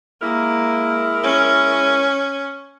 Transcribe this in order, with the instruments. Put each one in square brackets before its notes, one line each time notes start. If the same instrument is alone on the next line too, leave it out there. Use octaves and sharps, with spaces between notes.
[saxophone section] G#3 E4 A#4 [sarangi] A#3
[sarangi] C#4